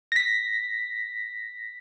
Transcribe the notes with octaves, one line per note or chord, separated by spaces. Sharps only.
A#6 B6